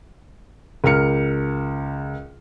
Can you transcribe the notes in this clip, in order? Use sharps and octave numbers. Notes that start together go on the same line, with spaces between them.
C#2 A#4 F6 C#7